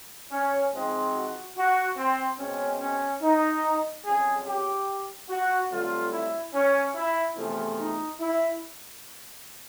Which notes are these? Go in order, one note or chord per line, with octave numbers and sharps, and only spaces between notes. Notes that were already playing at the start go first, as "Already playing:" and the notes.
C#4
G#2 F3 G#3 C4
F#4
F#4
C4
B2 G#3 C4 C#4
C#4
D#4
F2 C#3 F#3 G#4
G4
F#4
G2 D3 F#3 A3 C4 F4
E4
C#4
E4
E2 C3 F3 A3
D#4
E4